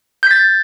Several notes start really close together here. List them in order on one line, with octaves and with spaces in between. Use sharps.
G6 B6 A6